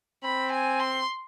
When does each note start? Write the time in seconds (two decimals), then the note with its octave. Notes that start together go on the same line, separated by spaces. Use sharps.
0.24 C4 B5
0.52 G#5
0.80 C6